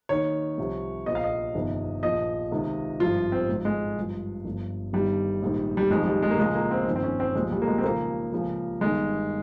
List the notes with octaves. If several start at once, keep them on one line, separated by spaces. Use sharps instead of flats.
D#2 D#3 C#5
C2 C3 F3
A#1 A#2 F3 D#5
F5
D#5
G1 F2 C3 D#3
A#1 A#2 F3 D#5
C#2 C3 D#3
G#1 G2 F3 F4
C4
G#1 G#2 F3
G#3
G#1 G2 F3
G1 G2 F3
G1 G2 D#3 G3
A#1 G#2 D#3
G3
F1 F2 D#3 G#3
G3
G#3
A#3
C#2 C#3 F3 G#3
A#3
C4
G1 F2 D#3
C4
C#4
C4
C2 A#2 F3 G#3
G3
A#3
G#3
C4
D#2 C#3 F3 A#3
C#2 C#3 F3
G1 G2 D#3 G#3